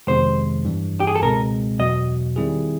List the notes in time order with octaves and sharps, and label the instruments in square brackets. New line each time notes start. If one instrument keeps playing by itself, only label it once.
[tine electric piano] F2 C3 D#3 G#3 B3 [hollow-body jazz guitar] C5
[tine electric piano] G2 E3 G3
[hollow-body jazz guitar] G4
G#4
A4
[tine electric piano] C#2 B2 G#3 C4 [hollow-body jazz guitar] A#4
[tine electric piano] E2 B2 F#3 B3 [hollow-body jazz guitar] D#5
[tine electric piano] D#3 G3 C4 E4 G#4